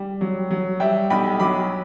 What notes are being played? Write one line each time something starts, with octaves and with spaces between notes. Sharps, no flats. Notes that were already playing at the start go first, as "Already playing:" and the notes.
Already playing: G3
F#3
F#3
G3 E5 G5
B1 G5 B5
F#3 B5 D6